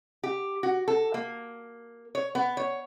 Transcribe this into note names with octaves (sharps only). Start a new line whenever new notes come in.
G4
F#4
A4
A#3
C#5
B3
C#5